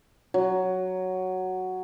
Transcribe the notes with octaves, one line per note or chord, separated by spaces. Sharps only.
F#3